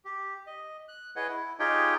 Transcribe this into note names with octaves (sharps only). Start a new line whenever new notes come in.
G4
D#5
F#6
E4 G#4 B4 C#5 D#5 F#5
E4
D#4 F4 G4 G#4 C#5 G5